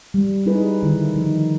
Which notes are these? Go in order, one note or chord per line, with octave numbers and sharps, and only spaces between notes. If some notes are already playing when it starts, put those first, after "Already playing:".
G3
G3 D#4 E4 G#4 B4
D3 D#3 E4
D#3 F3 D#4